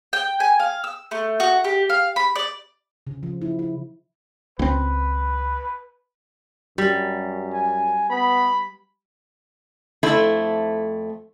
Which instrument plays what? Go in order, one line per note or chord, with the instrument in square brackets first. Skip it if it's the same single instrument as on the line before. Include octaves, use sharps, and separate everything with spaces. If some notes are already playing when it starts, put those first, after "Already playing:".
[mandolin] G5
G#5
F5
E6
A3
F#4
G4
F5
B5
D5
[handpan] C#3
F3
E4
E4
[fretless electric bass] C#2 C4 [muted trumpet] B4
[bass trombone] F#2 [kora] G3
[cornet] G#5
[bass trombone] B3 [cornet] B5
[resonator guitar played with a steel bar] F2 A3 E4 C5